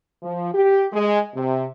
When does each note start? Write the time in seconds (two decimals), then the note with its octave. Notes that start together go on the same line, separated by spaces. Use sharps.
0.23 F3
0.54 G4
0.93 G#3
1.35 C3